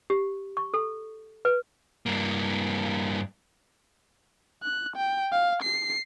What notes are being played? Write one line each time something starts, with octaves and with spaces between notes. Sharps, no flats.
G4
C#6
A4
B4
G2 A#3
F#6
G5
F5
C7